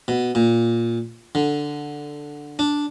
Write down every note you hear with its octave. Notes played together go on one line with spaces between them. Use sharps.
B2
A#2
D3
D4